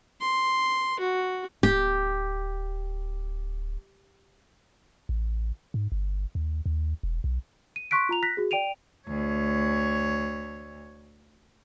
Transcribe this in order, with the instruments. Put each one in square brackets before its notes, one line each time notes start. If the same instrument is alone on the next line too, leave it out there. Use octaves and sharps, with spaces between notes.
[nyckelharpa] C6
F#4
[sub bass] D1 [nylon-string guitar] G4
[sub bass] A1
G#2
G1
D#2
D#2
E1
B1
[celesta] D#7
C6 C#6 F#6 B6 D7
F4 A#5 F7
F#6 A#6 B6
F#4 G#4
D5 G5 D7 D#7 F7
[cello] D2 C#5